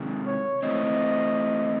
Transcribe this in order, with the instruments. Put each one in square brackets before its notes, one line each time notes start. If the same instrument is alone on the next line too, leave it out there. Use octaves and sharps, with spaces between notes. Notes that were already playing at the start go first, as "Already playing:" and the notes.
Already playing: [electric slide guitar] C3 D#3 G#3
[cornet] C#5
[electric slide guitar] E3 A3 C4 [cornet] D#5